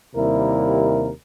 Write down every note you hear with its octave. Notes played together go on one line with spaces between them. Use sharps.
D#2 C3 G3 E4 A#4